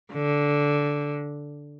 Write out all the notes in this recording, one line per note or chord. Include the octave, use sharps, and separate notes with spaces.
D3